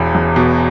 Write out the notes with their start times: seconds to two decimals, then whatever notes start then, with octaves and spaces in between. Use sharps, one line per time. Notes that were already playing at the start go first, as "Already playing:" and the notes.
Already playing: E1 E2 B5
0.15 E1
0.36 B2